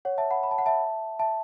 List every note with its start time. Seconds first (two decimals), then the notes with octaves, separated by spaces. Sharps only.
0.05 C#5 F#5
0.18 E5 A5
0.31 F#5 B5
0.43 B5
0.51 A5
0.59 F#5
0.66 E5 A5
1.19 E5 A5